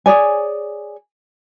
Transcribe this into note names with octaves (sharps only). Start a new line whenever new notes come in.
G#4 C#5 D5 G#5